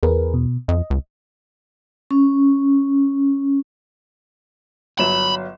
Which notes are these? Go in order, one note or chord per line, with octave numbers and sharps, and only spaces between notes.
E2 G#4 A#4 B4
B2
F2 D#5
C#2
C#4
G1 F#3 B5 E7